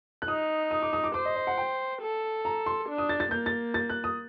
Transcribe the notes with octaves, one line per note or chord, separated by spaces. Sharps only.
F#6
D#4 D#6
D#6
D6
D#6
D6
C5 D6
D#5
D#5
F#5
G5
A4
A#5
C6
D4
D#6
A6
A6
A#3 G6
A6
A6
F#6
D#6